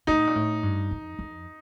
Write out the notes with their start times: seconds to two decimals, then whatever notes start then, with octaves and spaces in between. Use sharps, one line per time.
0.07 A2 D#4
0.27 A#2
0.36 A2
0.63 G2
0.91 F2
1.19 F2